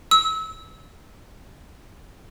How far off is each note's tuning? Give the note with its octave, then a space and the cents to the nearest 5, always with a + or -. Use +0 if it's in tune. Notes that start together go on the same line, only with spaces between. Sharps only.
E6 -30